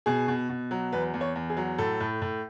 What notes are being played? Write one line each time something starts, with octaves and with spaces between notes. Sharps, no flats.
B2 G#4
B2
B2
F#3
E2 B4
E2
C#5
E2
G#4
F#3
A2 A4
A2
A2